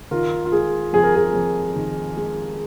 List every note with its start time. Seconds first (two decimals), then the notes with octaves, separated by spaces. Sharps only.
0.11 D#3 F4 A#4
0.45 F4
0.52 G#3 G#4
0.93 F2 G#4
1.04 A#4
1.15 G#4
1.34 F2
1.75 D#3
2.16 G#3